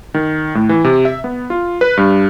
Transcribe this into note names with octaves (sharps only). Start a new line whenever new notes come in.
D#3
A2
E3
C3
E5
B3
F4
B4
G2